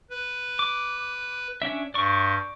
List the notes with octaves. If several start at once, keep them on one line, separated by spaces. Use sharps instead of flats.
B4
D6
C#4 D4 E5
G2 D5 C#6